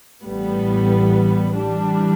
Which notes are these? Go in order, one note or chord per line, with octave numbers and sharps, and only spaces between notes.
A1 A2 E3 G3 B3
E3 G3 D4